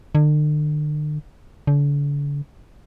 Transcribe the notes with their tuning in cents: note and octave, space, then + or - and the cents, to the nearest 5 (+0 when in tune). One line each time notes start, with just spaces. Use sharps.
D3 +40
D3 -40